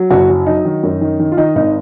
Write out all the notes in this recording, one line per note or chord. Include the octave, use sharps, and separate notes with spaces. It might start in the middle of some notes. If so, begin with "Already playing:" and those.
Already playing: F#3
F#1 F#4
F#3
F#3 D#4
D#3
F#2
D#3
D#3
F4
D#3 D#4
G#1 D#4